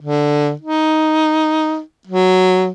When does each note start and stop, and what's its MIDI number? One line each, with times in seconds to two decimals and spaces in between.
0.01 0.52 50
0.62 1.80 63
2.08 2.70 54